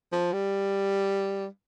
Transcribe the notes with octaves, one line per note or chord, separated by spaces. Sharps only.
F3
G3